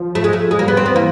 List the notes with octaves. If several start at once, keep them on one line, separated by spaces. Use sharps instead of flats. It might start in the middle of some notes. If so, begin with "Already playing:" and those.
Already playing: F3
A3
G#3
A3
G#3
G3 A#3
B3
C4
B3
E3 A#3